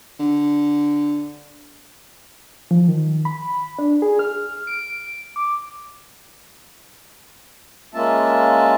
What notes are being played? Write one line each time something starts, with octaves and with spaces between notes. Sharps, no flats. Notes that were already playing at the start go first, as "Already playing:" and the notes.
D3
F3
D#3
B5
D4
G#4
F6
D7
D6
G#3 A#3 C#4 F4 E5 A5